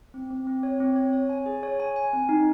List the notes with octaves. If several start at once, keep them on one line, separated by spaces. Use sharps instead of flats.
C4
C4
C4
C#5
C4
C#5
C#5
G#5
G#4
C#5
G#5
G#5
C4
D#4